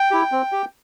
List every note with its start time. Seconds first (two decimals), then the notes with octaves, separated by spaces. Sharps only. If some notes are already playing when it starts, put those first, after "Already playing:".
Already playing: G5
0.11 E4 G4
0.32 C4
0.52 G4